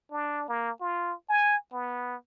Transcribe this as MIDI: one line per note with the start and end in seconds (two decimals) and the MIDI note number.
0.11 0.46 62
0.49 0.71 58
0.81 1.14 65
1.29 1.57 80
1.73 2.16 59